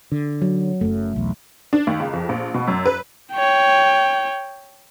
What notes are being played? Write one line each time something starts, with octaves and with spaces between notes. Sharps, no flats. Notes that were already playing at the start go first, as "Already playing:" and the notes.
D3
F#3
F#1 F#2 A3
B1 E2
D4
D#2
C#2
F2
A#1
B2
F#2
B4
C#5 G5